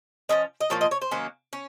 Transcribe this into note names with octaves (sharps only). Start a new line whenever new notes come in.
F3 A#3 C#4 D#5
D#5
A#2 F3 A#3 C#5
D#5
C#5
C5
D#3 F#3 A#3 C#4
C#4